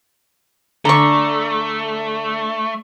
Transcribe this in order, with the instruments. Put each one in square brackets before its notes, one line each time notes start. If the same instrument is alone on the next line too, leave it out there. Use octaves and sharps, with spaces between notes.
[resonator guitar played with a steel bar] D3 [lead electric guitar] A3 [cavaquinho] A#5 C#6